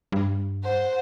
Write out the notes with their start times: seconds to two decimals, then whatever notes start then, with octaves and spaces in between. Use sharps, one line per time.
0.12 G2
0.64 C5 F#5